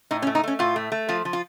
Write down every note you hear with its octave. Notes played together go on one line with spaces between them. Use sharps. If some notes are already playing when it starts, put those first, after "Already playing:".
A2 D#4
C#4
A3
D#4
A3 C#4
A2 F4
A3
A3
F3 F4
F3
F4